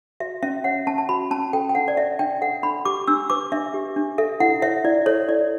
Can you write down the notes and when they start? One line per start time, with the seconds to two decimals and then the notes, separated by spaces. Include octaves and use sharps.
0.20 F#4 E5
0.43 C#4 E5
0.64 C#5 F#5
0.87 C#4 A5
0.98 A5
1.09 F#4 B5
1.31 C#4 A5
1.53 A4 G5
1.69 G5
1.75 D4 F#5
1.88 D5
1.97 C#5 E5
2.19 D4 G5
2.42 A4 F#5
2.63 D4 B5
2.85 G4 D6
3.07 D4 E6
3.30 B4 D6
3.52 D4 E5
3.74 G4
3.96 D4
4.18 A4 E5
4.40 E4 F#5
4.62 C#5 E5
4.84 E4 D5
5.06 A4 C#5
5.29 E4 D5